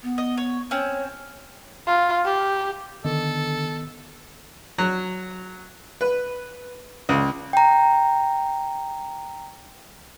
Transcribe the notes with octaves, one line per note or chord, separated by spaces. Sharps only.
B3
D#5
C#5
C4 C#4 C#5
F4
G4
D3 D#3 B3 A4 D#5
F#3
B4
C#2
G5 A#5